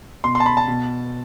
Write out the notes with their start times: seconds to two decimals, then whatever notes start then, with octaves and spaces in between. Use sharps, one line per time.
0.24 B2 C6
0.35 C6
0.40 A5
0.46 B5
0.57 A5
0.68 B2